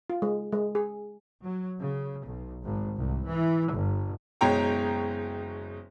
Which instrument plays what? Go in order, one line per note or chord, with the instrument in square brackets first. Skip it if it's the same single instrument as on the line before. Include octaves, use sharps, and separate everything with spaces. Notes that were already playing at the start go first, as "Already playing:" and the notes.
[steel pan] F4
G#3
G#3
G#4
[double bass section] F#3
C#3
B1
G#1
C2
E3
G1
[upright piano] F#1 B2 G#3 C#5 G5 A#5